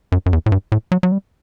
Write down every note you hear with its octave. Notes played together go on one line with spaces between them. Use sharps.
F#2
F#2
E2
A2
G2
A2
F#3
F#3
G3